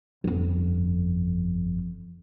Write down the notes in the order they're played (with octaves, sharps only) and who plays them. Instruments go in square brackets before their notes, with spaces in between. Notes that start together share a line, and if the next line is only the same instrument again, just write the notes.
[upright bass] G1 F2